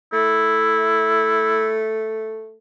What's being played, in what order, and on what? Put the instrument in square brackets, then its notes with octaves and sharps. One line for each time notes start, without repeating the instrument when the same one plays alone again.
[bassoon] A3 [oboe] E4